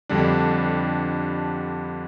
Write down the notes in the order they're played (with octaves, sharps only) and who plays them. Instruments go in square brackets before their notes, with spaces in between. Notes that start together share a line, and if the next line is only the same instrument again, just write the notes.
[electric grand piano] F2 D3 G3 D4